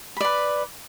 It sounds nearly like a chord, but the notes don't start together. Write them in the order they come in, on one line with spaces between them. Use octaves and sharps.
B5 D5 B4